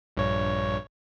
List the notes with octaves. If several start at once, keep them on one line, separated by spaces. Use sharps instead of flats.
A#1 G2 C#5